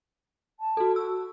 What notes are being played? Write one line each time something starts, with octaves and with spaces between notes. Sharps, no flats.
A5
F#4 A4
F#4 E6